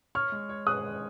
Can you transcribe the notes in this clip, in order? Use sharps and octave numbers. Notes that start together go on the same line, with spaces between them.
C#5 C#6 F6
G#3
C#5
G#4 D#6 F#6
G#3